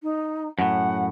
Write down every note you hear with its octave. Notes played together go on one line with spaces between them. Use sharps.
D#4
F#2 A2 F#5